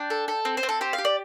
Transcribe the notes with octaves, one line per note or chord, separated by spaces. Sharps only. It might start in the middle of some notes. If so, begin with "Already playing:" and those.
Already playing: D4 G5
A4
A4
C4
C5
C4
A4
G4 C5
F5
G4
D5